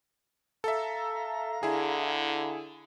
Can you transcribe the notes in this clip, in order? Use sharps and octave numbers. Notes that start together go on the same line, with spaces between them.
A4 E5 F5 A#5
D3 E4 G#4